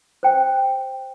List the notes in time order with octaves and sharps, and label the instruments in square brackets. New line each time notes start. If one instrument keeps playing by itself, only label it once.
[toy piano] C5 G5